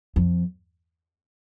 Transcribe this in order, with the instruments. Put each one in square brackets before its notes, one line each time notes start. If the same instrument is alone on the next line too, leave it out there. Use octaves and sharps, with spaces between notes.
[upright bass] F2